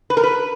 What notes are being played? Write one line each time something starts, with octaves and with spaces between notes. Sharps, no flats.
B4
A#4
B4